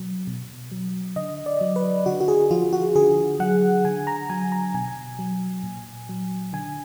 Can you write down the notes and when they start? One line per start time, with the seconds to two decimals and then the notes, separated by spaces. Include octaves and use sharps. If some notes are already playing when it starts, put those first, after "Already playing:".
Already playing: B2 F#3
0.27 B2
0.72 F#3
1.16 D3 D#5
1.46 D5
1.61 F#3
1.76 B4
2.06 D3 F#4
2.20 F#4
2.28 G#4
2.51 F3 F4
2.73 F#4
2.96 D3 G#4
3.40 F#3 F#5
3.84 D3 G#5
4.07 A#5
4.30 F#3 G#5
4.52 A#5
4.74 B2 G#5
5.19 F#3
5.63 A#2
6.09 F#3
6.53 D3 G#5